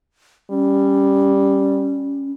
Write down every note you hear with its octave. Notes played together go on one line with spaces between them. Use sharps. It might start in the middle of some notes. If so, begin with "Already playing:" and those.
G3 C#4